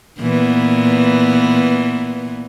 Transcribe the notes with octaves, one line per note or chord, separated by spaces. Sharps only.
A#2 E3 B3